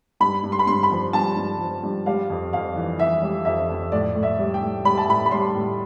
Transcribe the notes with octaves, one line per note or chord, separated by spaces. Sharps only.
G2 B5
G2
C6
B5
G2 C6
B5
F3
G2 A5
G2
F3
G2
G3 F5
F2
F2 F5
E3
E3 E5
G3
F2 E5
F2
A2 D5
A2
E5
G3
G5
A2
G3 B5
A5
A2 B5
B5
G3 C6
A2